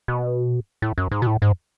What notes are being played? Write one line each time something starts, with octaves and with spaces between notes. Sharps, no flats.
B2
A2
F#2
G#2
B2
A2
G#2